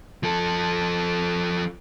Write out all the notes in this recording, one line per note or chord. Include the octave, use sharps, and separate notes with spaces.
F3 A4